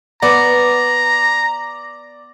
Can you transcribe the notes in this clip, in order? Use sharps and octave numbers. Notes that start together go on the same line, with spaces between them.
B3 D5 A#5